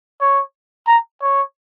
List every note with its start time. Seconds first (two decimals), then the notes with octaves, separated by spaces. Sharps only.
0.21 C#5
0.88 A#5
1.22 C#5